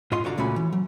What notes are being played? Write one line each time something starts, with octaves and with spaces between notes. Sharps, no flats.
G#2 F4 D#5 C6
C2 D3 F#4 D5 F5 A#5
C#2 A#2 A3 C#4 F#4 B5
E3
F#3